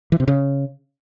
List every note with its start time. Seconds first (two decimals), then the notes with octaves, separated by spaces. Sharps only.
0.12 E3
0.20 C3
0.28 C#3